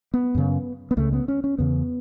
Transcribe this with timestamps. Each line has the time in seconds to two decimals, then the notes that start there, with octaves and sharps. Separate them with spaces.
0.14 B3
0.35 F#2 C#3
0.91 B3
0.97 C#2 C#3 A3
1.13 B3
1.28 C#4
1.44 C#4
1.59 E2 C#3 B3